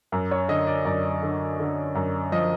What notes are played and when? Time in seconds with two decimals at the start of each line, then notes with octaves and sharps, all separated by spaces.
0.12 F#2
0.31 C#5
0.48 D3 D#5
0.67 D5
0.85 F#2 D5
1.22 D3
1.59 D3
1.95 F#2
2.32 F3 D#5